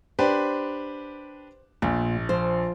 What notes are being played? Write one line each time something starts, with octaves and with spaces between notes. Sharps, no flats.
D4 G4 B4 C5
A#1 A#2
F3 C5